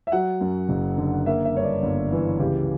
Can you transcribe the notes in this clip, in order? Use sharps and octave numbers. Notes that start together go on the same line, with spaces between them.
E5
F#3 F#5
F#2
F#1
D3
A#3 E5
E5
G2 C#5
D5
G1
E3
C#2 G4